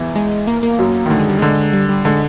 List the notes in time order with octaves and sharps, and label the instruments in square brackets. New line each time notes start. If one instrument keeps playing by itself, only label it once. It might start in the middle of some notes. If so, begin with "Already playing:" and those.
Already playing: [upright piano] E2 E3
[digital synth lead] G#3
A#3
A#3
[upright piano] F#2 F#3
D#3
[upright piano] D3 [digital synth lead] A3
[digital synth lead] G#3
G3
[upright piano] D3 [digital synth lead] G#3
[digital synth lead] G3
G3
[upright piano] D3 [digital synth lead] G#3